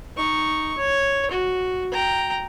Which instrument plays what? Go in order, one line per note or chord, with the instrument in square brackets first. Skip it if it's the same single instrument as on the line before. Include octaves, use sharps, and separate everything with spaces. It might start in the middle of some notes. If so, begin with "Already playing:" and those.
[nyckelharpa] D#4 C#6
C#5
F#4
G5 A#5